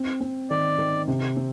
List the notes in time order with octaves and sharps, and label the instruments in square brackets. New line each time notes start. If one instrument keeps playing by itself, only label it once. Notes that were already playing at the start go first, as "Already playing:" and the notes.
Already playing: [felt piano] C4
C4
[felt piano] D#3 [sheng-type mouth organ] D5
[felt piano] D#3
C3
C4